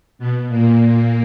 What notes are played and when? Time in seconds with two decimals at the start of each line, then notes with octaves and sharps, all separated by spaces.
0.19 B2 B3
0.48 A#2 A#3